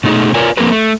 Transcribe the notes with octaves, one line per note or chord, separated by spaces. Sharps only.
B2 A3 D#4 G#4
F4 A#4 B4 C#5 D5 G#5
F3 A#3 C4 G#4 A#4 B4
A3